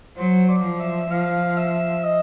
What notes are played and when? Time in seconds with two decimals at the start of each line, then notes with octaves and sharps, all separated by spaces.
0.17 F#3 C5
0.49 D5
0.64 F3
0.80 E5
1.10 F3 F5
1.57 E5
2.04 D#5